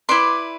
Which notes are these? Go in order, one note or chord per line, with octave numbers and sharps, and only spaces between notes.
E4 B4 D5 C6